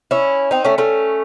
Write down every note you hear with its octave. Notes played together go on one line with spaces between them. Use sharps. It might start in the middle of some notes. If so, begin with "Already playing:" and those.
C#4 E4
C4 D#4
A3 C#4
A3 C#4